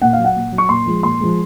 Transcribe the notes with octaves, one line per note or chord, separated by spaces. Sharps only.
A#2 F#5
F5
F#3
F#5
A#2
F#3
C#6
A#2 C6
F3 G#3
A#2 C6
F3 G#3